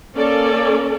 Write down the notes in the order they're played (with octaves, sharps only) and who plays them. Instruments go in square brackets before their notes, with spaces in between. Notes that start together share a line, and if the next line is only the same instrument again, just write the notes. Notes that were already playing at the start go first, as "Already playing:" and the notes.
[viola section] A#3 C#4 A4 D5